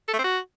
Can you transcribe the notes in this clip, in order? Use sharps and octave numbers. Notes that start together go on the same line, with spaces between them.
A4
A3
C4
F#4